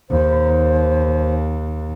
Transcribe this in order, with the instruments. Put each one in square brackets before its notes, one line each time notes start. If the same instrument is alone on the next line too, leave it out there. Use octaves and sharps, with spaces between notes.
[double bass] D#2 [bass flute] C5